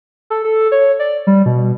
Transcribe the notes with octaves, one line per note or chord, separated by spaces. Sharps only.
A4
A4
C#5
D5
G3
B2